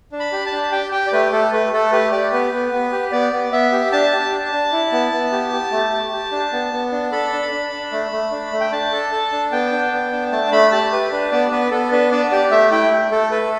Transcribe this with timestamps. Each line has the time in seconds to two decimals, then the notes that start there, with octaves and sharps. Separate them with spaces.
0.12 D4
0.20 B5
0.32 G4
0.46 A5
0.52 D4
0.72 G4 G5
0.92 G4 G5
1.07 D5
1.12 A3 B4
1.32 A3 A4
1.52 A3 B4
1.73 A3 A4
1.92 G4 B4
2.12 G4 D5
2.32 B3 B4
2.52 B3
2.72 B3
2.92 G4
3.12 B3 D5
3.33 B3
3.52 B3 E5
3.72 G4
3.92 D4 A5
4.12 G4
4.32 D4
4.52 D4
4.72 E4
4.92 B3
5.12 B3
5.32 G4
5.52 G4
5.71 A3
5.93 G4
6.12 G4
6.32 D4
6.53 B3
6.72 B3
6.91 D4
7.12 A4 B5
7.32 D4
7.52 D4
7.72 D4
7.92 A3
8.12 A3
8.31 D4
8.52 A3
8.61 G5
8.72 D4 A5
8.92 A4
9.12 A4
9.32 D4
9.52 B3 G5
9.72 D4
9.92 B3
10.12 D4
10.32 A3 A5
10.52 A3 B5
10.72 G4 A5
10.92 G4 B4
11.12 D4 B4
11.31 B3 D5
11.51 B3 B4
11.71 B3 A4
11.92 D4 B4
12.11 D4 D5
12.31 G4 D5
12.51 A3 E5
12.71 E4 G5
12.91 A3
13.11 A3 A4
13.31 A4 B4